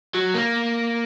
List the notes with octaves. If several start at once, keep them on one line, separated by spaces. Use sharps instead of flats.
F#3
A#3